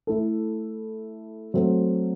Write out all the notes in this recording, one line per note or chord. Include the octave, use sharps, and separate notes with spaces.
A3 E4 A4
F#3 A3 C4